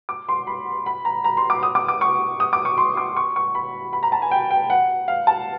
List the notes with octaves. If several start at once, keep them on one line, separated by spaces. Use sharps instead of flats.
D6
C6
B5
B5
A#5
A#5
C6
D6
D#6
D6
D6
C#6
D#6
D6
C#6
C6
D6
C#6
C#6
B5
B5
A#5
A5
G#5
G5
G5
F#5
F5
A5